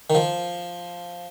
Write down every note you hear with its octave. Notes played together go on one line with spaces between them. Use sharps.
D#3
F3